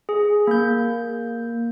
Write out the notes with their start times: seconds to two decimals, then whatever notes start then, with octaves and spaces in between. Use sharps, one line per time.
0.09 G#4
0.47 A#3 G6